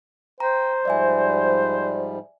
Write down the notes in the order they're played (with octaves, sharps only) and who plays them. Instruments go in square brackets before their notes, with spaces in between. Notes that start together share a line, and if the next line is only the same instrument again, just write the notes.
[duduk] C5 [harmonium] G5 [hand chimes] A#5
[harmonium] G#2 F3 G3 [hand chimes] D5 E5 G#5